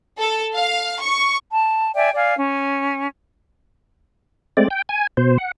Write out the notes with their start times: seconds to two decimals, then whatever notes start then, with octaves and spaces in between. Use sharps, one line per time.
0.20 A4
0.55 F5
1.01 C#6
1.49 A5
1.95 D5 E5 G5 G#5
2.14 D5 F5 G#5
2.37 C#4
4.57 G#3 A3 C4 D5
4.71 G5
4.89 G#5
5.17 B2 C5
5.38 F#5